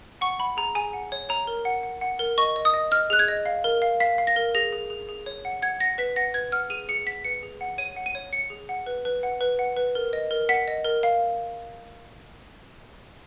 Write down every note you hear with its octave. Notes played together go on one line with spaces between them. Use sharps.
F#5 C#6
F#5 B5
G#4 A#5
G#4 G#5
F#5
C#5
C#5 A#5
A#4
F#5
F#5
F#5
A#4
D#5 C#6
D#5
D#6
D#5
D#5 F6
G#4 F#6
G#6
D#5
F5
A#4
F5
F5 B6
F5
A#6
A#4
G#4 A#6
G#4
G#4
G#4
C#5
F#5
F#5 G#6
F#5 A#6
B4 B6
F#5 A#6
B4 G#6
F#5 F6
G#4 D#7
G#4 C#7
F#5 B6
B4 C#7
G#4
F#5
C#5 D#7
F#5
D#7
C#5
C#5 C#7
G#4
F#5
B4
B4
F#5
B4
F#5
B4
A#4
D#5
A#4
F#5 B6
D#5
A#4
F5